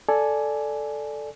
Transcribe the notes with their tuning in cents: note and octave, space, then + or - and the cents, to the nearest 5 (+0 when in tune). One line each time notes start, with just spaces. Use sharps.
A4 +0 D5 +0 G#5 +10